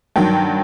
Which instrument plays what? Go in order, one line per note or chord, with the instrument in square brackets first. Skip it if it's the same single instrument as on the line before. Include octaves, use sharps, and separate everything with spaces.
[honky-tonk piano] G2 D#3 F#3 G5